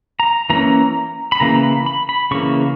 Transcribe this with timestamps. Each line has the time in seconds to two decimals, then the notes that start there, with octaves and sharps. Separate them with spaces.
0.20 A#5
0.50 E3 A#3 C#4 A#5
1.32 B5
1.40 C#3 E3 A#3 A#5
1.63 B5
1.86 B5
2.09 B5
2.31 C#3 E3 A#3 C#6